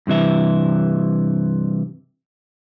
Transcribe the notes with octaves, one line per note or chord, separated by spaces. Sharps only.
G2 C3 E3 E5